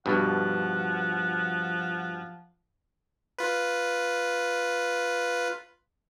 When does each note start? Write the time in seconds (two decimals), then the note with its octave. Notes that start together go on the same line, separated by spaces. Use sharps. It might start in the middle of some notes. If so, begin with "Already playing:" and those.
0.06 G2 B2 F3 F#5
3.39 F4 B4